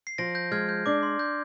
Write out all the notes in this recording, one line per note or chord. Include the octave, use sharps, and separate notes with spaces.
C7
F3 A#6 D7
G6 A#6
G#3 F6 G#6
G6
D4 D6
C6
G6